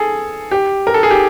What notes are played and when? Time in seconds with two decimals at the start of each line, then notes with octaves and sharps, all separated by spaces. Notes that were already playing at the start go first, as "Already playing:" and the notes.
Already playing: G#4 A4
0.51 G4
0.87 A#4
0.94 A4
1.03 G#4
1.11 G4